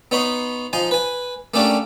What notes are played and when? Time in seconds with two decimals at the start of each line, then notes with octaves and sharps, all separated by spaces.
0.11 B3 D#4 C#5 B5 C6
0.73 F3 D#4 G#5 C6
0.91 B4 G#5
1.54 A3 A#3 C#4 D4 G4